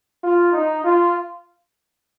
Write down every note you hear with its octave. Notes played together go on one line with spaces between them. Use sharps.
F4
D#4
F4